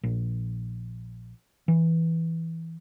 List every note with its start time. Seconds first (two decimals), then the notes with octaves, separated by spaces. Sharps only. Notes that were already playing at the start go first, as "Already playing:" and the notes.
0.03 A#1
1.68 E3